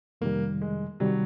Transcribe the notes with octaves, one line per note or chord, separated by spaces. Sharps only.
F2 C3 D#3 G3 A#3
G#3
C3 D#3 F#3 G3